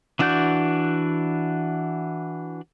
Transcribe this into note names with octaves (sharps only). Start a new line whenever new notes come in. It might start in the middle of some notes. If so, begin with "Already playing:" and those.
E3 D4 F#4 D5 G6